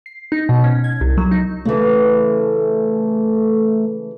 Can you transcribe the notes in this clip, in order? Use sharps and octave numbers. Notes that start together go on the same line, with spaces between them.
C7
D#4
B2
C#4
G#6
C2
F#3
D#4
C#3 E3 A3